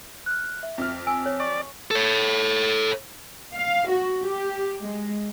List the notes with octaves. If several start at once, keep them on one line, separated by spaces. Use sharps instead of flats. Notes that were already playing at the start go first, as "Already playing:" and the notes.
F6 F#6
E5
F2 F6
G#5 E6
C#5
D5 C#6
A4 C#5
F5
F#4
G4
G#3